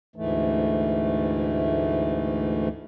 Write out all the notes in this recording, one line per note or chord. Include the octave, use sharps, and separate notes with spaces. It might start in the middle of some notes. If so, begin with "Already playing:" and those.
D2 G#2 E3 A3